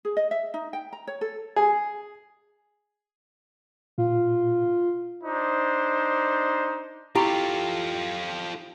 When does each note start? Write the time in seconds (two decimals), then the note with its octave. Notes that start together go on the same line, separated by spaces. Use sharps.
0.05 G#4
0.17 D#5
0.31 E5
0.54 D#4
0.73 G5
0.93 A#5
1.07 C#5
1.21 A4
1.56 G#4
3.98 A#2 F4
5.24 D4 D#4 C5
7.16 E4 F4 G4 A4 B5 C#6